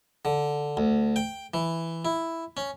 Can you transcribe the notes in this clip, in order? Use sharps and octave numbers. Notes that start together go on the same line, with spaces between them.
D3
D2
G5
E3
E4
C#4